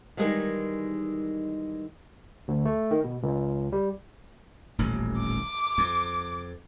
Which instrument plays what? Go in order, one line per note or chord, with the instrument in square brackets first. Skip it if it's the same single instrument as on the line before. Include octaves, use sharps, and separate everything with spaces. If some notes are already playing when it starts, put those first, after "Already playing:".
[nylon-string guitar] D#3 E3 G3 G#3 G#4 A#4
[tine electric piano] D2
A3
D#3
B2
C#2
G3
[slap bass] D#1 A1 F2
[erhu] D6
[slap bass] F2